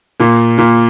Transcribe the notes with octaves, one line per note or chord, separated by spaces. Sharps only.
A#2 A#3
A#2 A#3